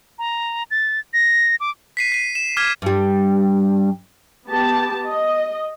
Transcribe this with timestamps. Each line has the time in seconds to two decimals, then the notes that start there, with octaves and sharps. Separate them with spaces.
0.19 A#5
0.71 A6
1.14 A#6
1.60 D6
1.97 B6 C7 D#7
2.12 C7 D#7
2.35 E7
2.57 D6 F6 G#6 B6
2.82 G2 G3
4.47 B3 G4 A5
5.07 D#5